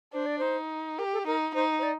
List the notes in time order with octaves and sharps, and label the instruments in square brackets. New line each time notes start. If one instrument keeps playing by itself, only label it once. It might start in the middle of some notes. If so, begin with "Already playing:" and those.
[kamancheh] D4 [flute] C5
[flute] D5
[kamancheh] D#4 [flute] C5
[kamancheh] G4 [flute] A#4
[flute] A4
[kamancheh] D#4 [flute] A#4
[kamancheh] D#4 [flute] C5
[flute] C5
D5